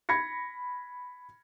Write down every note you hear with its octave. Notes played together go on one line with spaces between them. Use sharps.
B5 G#6 A#6 C#7